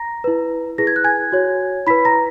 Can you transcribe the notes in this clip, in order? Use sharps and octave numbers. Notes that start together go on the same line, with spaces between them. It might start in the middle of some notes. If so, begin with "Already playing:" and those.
Already playing: A#5 A#6
E4 B4
E4 G#4 B4 A#6
G#6
F#6
G#5 G#6
F#4 C#5
E4 B4 B5 B6
A#5 A#6